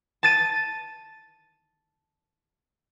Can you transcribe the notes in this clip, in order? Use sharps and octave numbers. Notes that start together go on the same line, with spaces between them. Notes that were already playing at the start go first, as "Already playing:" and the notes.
A5 A6 D#7